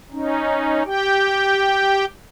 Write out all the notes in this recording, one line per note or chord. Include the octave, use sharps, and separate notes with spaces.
C#4 D#4
G4 G5